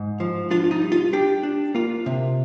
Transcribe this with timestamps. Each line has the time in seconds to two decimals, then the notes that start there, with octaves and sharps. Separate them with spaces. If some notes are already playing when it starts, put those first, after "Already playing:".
Already playing: G#2
0.20 F3
0.51 D4 F4
0.64 F4
0.71 D#4
0.82 G3
0.92 F4
1.13 D4 G4
1.43 D4
1.75 A#3 F4
2.06 C3